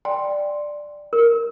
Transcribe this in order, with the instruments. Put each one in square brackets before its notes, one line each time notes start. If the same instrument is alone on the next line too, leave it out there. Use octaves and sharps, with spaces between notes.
[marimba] D5 C6 [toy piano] G5
[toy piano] A#4